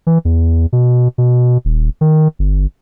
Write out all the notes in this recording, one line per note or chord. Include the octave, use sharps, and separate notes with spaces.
E3
E2
B2
B2
D#1
D#3
G1